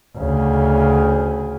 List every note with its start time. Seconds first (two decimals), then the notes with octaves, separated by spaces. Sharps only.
0.17 D2 C#3